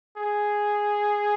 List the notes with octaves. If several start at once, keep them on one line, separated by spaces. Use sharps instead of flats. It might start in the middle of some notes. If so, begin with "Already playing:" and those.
G#4